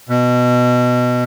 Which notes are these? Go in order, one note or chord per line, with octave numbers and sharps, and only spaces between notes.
B2